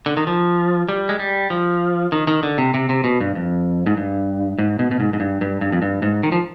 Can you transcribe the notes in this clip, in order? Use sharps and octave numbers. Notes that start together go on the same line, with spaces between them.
D3
D#3
F3
G3
G#3
G3
F3
D#3
D#3
D3
C3
C3
C3
B2
G2
F2
G#2
G2
G#2
B2
B2
G#2
G#2
G2
G2
G2
F2
G2
G#2
D#3
F3